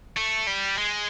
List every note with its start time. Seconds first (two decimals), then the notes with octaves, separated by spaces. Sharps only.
0.16 A3
0.47 G3
0.78 G#3